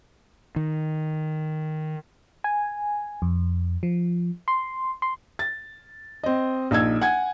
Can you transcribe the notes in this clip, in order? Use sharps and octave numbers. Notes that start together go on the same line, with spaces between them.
D#3
G#5
F2
F3
C6
C6
A6
C4 D#5
A#1 D#4 E6 G#6
F#5 G#5 G#6